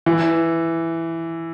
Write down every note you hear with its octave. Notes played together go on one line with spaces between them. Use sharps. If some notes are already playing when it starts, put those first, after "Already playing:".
E3